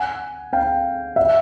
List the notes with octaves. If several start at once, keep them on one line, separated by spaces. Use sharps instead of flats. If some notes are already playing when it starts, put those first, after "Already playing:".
Already playing: F#5 G#5
F5 G5
E5 F#5